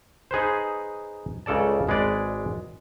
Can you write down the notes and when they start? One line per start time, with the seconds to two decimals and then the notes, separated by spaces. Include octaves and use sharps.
0.31 D#4 G#4 B4 C5
1.46 C#2 C#3 A4 D5 A5
1.87 G#1 G#3 B4 D5